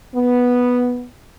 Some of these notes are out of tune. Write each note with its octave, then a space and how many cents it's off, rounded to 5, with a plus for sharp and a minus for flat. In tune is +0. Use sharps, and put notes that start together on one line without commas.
B3 -5